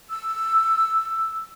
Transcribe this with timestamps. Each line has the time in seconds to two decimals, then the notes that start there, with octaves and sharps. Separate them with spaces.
0.10 E6